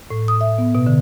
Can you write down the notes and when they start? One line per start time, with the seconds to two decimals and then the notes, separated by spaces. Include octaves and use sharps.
0.11 A2
0.28 D#6
0.41 E5
0.58 B3
0.75 B2
0.87 D3